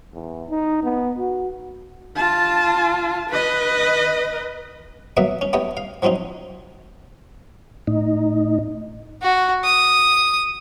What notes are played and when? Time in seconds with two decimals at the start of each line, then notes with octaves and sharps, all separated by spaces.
0.14 E2
0.49 D#4
0.83 B3
1.18 F#4
2.17 F4 A5
3.30 B4 D#5
5.17 F#3 A#3 B3 B4 D#5 E5
5.41 C#4
5.53 A3 B3 G4 C#5 D#5
5.77 F5
6.02 F3 F#3 C4 C#4 D#4
7.87 A2 D#4
9.23 F#4
9.65 D#6